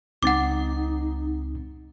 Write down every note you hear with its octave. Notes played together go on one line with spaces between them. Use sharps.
C#2 C4 D#4 F#5 D6 A6